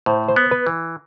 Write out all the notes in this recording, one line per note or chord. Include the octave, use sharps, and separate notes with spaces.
A2 C5
C5
B3
B4
E3